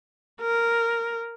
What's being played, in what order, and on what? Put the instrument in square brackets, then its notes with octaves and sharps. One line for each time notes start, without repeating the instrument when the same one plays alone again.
[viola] A#4